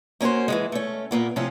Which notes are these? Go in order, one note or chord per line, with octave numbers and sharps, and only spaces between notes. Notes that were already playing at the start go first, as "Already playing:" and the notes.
A#3 C#4 E4 F#4 C5
E3 F3 G#3
A3 C#4
A#2 A#3 B3
A2 C3 F3 C4 C#4 F4